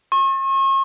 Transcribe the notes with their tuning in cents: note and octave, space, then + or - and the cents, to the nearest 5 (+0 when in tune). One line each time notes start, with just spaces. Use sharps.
C#6 -40